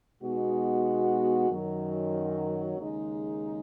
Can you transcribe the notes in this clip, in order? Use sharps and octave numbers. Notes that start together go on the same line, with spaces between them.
B2 G#3 B3 D#4 F#4
F#2 D#3 F#3
D#2 C#3 G#3 D#4